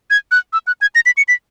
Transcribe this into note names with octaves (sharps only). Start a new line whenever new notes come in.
G#6
F#6
E6
F#6
G#6
A#6
B6
C#7
B6